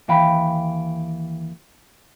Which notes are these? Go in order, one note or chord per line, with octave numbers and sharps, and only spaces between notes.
D#2 E3 F5 G5 B5